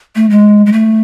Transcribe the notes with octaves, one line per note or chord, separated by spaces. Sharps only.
A3
G#3
G#3
A3